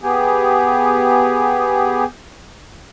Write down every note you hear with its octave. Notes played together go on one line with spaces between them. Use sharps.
B3 G4 G#4